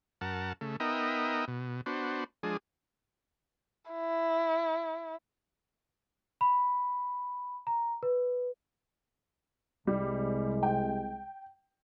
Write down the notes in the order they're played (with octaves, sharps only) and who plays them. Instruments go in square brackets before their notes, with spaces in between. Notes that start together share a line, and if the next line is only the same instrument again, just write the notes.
[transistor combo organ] F#2 A#4 F#5 A5
C#3 A3
B3 D#4 A#4 D#5 E5 G5
B2
B3 D4 F#4 C5
F3 G#3 D4 G#4
[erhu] E4
[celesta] B5
A#5
B4
[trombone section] C2 C3 G#3 [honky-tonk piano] G3
[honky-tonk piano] G5